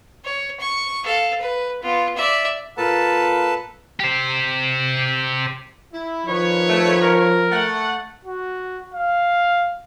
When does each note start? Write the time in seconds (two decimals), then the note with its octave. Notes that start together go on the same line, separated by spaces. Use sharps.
0.24 C#5
0.60 C#6
1.04 A4 F5
1.40 B4
1.82 B3 F4
2.16 D5 E5
2.78 A#2 A4 B4 F5 A5 A#5
4.00 G4 C5
5.94 E4
6.27 D#3 F3 B4 C#5
6.69 A3
7.02 A#4
7.51 A3 F#5
8.25 F#4
8.94 F5